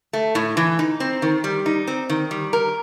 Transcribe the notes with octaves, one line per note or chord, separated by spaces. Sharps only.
A3
A2
E3
D#4
C4
D#3
G3
D#4
C4
D#3
G3
A#4